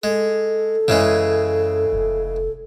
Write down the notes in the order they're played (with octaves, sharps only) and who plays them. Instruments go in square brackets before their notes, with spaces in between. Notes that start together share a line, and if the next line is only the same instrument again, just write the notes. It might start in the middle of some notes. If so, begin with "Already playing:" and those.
[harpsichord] G#3 [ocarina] A4
[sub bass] F#2 [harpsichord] C#3 E3 G#3
[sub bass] F1